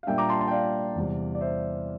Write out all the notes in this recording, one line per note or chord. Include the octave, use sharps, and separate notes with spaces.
F5
A#2 G3 A#3 D4 E5 G5
A#5 D6
A5 C6
A5 C6
G5
D5 F5
E2 C3 G3
D5
C5 E5